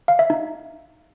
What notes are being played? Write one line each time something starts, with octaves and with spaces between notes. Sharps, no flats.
F5
E5
D#4